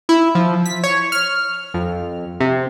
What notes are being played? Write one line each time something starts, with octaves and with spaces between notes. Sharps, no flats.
E4
F3
B6
C#5
F6
F2
C3